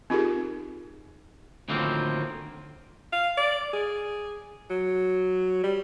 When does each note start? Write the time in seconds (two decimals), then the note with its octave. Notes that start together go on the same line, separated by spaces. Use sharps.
0.10 C4 D#4 F4 G4 G#4 A#4
1.68 D2 A2 D#3 F3 A#3 C4
3.13 F5
3.37 D5
3.73 G#4
4.70 F#3
5.64 G3